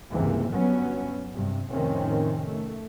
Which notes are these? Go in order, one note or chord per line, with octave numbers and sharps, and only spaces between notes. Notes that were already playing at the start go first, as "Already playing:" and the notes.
C#2 G2 C3 E3 A#3
G1 G2 F#3 B3 C#4
G2 C3
F2 A2 C3 D#3 C4 C#4
A3